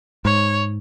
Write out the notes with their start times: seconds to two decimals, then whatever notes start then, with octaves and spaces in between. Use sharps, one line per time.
0.25 G#2 C#5